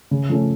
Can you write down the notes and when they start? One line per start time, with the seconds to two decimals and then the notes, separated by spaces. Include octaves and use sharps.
0.11 C#3
0.29 F3 A3 C#4